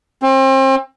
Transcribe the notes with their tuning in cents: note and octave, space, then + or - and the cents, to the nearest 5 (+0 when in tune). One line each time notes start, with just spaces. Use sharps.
C4 +35